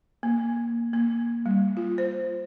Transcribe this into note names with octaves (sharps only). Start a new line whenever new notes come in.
A#3
A#3
G3
F4
C5